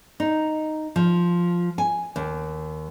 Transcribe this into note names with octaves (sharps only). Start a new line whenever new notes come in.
D#4
F3
G#5
D#2